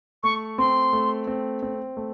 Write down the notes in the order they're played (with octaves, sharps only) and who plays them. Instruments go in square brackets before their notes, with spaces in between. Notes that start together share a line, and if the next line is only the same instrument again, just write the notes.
[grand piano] A3 [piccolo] C#6
[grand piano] C4 [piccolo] C6
[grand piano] A3
C4
C4
A3